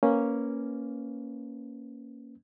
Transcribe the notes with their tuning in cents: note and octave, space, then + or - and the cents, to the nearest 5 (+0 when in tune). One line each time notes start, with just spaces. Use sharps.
A#3 +0 C#4 +0 B4 +10